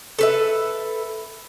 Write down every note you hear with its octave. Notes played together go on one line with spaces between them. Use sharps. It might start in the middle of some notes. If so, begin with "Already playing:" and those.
A4 B4 E5